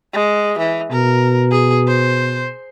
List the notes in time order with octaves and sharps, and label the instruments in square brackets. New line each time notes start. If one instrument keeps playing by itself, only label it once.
[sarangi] G#3
E3
[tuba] B2 [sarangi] A#4
[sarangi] G#4
C5